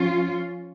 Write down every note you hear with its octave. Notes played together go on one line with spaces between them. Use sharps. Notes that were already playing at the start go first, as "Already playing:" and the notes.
Already playing: F3 C#4 F4